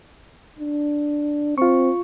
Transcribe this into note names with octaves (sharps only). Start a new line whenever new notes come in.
D4
C4 F4 C#6